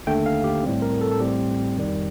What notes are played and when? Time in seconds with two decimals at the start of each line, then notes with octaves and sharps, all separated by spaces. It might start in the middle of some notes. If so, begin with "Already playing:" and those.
0.07 D#2 D3 A3 G5
0.26 F5
0.44 G4
0.63 A2 G3 C4
0.82 A#4
1.01 A4
1.11 A4
1.20 A1 A2 G3 C4 G4
1.76 F2 D#3 G3